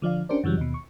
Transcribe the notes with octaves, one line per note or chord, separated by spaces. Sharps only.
D3 F3 D5 F5
C#4 D4 G4 A#4 C5 D5
F#2 C#3 E3 F#3 G3
D#2 B2
C#6